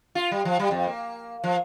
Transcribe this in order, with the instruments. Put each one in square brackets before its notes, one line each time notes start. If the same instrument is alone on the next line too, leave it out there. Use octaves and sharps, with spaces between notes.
[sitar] F4
G3
F3
G3
F2
A#3
F3